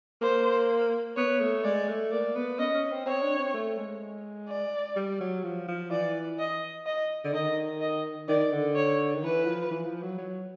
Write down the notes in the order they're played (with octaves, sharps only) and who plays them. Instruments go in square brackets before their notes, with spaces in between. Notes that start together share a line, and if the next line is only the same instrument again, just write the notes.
[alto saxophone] A#3 [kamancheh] C5
[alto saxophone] B3 [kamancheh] C#5
[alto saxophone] A3
[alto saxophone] G#3 [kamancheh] D5
[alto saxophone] A3
[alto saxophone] A#3 [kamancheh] D5
[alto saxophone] B3
[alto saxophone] C#4 [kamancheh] D#5
[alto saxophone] C#4
C4
[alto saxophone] C4 [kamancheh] C#5
[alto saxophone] D4
C4
A3
G#3
[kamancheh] D5
[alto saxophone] G3
F#3
F3
F3
[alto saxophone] E3 [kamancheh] D5
[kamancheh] D#5
D#5
[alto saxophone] D3
[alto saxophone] D#3 [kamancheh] D#5
[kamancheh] D#5
[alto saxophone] D#3 [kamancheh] D5
[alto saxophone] D3
[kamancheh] C#5
[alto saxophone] D#3
[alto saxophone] E3 [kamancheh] B4
[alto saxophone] F3
E3
F3
F#3
F#3